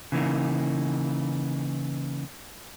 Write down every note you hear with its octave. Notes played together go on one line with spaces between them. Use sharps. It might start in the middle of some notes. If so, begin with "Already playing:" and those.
C#3 E3 A#3 D#4